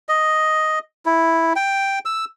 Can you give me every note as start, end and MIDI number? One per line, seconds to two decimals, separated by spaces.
0.09 0.79 75
1.06 1.53 64
1.56 1.99 79
2.05 2.25 88